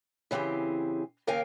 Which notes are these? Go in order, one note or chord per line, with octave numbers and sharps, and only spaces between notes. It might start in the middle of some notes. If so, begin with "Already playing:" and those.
C#3 E3 C4 G4 G#4
D#2 C#3 A#4 F5 G5 G#5